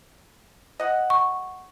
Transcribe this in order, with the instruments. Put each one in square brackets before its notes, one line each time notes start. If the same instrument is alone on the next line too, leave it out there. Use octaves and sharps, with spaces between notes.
[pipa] D#5 F#5
[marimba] C#6